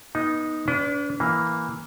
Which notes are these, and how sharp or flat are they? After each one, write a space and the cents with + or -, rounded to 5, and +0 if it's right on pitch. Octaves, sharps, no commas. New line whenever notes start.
B3 -30 D#4 +0
D4 -40 B4 +25
E3 +0 A#3 +0